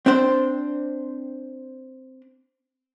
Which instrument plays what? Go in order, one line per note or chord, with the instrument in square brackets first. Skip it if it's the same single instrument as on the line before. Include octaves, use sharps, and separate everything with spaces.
[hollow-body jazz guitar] C4 D4 C5